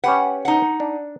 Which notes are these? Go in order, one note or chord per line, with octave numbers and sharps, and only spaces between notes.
C#4 G4 B4 F#5
D#4 F#5
D4